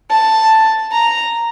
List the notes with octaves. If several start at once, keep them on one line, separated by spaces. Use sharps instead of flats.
A5
A#5